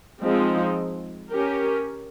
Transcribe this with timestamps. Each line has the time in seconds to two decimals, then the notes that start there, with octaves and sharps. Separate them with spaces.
0.21 F3 G#3 C4 D#4
1.30 C#4 G4 A#4